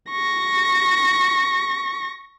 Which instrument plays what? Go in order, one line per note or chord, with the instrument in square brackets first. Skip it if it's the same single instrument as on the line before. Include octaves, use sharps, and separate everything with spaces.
[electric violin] C#6 A#6